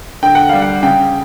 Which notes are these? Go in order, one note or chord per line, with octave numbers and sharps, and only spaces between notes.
D3 G5
F#5
G3 F5
F#5
C#3 G5